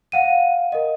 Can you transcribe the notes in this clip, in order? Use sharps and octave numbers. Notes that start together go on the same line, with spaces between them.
F5 F#5 D#7
A#4 D#5